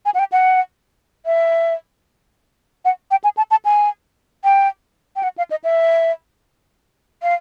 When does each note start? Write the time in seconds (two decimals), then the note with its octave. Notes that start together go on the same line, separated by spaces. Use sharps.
0.05 G#5
0.14 F#5
0.19 G5
0.32 F#5
1.26 E5
2.85 F#5
3.11 G5
3.24 G#5
3.37 A5
3.51 A5
3.65 G#5
4.44 G5
5.16 G5
5.23 F#5
5.38 F5
5.51 D#5
5.64 E5
7.23 F5